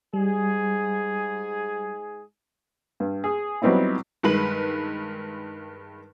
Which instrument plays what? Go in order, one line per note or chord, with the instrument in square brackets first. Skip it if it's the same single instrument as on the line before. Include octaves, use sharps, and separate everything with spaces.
[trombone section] G#2 G#4 [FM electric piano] G3
[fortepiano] G2
G#4
F#3 G3 B3 C4 D#4 E4
[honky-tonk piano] G2 D#3 G#3 B4 F#7